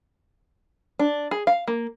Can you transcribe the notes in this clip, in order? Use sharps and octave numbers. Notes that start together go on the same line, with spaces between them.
D4
G#4
F5
A#3